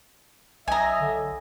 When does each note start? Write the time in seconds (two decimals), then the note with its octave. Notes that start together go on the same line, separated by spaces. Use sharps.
0.68 B1 D#5 E5 G#5 A#5
1.00 D3